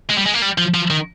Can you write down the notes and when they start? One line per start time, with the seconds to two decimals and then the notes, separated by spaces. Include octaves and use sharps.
0.09 G#3
0.17 G3
0.26 G#3
0.34 A#3
0.42 G3
0.58 F3
0.74 F3
0.90 D#3